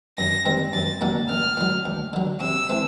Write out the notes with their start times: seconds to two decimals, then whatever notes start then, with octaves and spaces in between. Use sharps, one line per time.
0.18 F#2 A#6
0.45 D#3 G3 C4
0.73 F#2 A6
1.01 D3 F#3 A#3 C#4
1.29 A1 F6
1.57 A2 F#3
1.85 D2
2.13 D3 F#3
2.41 C3 E6
2.69 E3 A3 C4